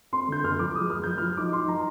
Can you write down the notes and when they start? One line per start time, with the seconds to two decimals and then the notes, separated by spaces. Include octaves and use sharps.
0.13 C4 C6
0.28 D3 G6
0.44 D3 F6
0.59 F3 D6
0.75 G#3 D#6
0.90 G#3 F6
1.04 F3 G6
1.18 F3 F6
1.37 D#4 D6
1.53 D#4 C6
1.68 F3 A#5